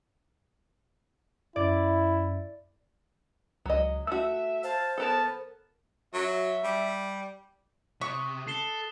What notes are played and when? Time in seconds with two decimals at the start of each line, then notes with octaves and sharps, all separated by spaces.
1.56 F#2 E4 D5
3.66 C#2 F#3 D#5
4.07 A3 F#4 E5 E6
4.63 C5 F5 A5
4.98 B3 A4 A#4 A5 B5
6.14 F#3 E5
6.64 G3
8.01 C3 C#6 D#6 F#6 B6
8.47 A4 C7 E7 G7